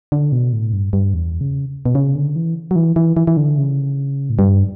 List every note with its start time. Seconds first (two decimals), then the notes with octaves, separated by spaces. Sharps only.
0.12 D3
0.32 B2
0.53 A2
0.73 G2
0.93 G2
1.14 E2
1.41 C#3
1.86 B2
1.95 C#3
2.16 D3
2.36 E3
2.71 F#3
2.76 E3
2.96 E3
3.17 E3
3.27 E3
3.37 D3
3.58 C#3
4.30 A2
4.39 G2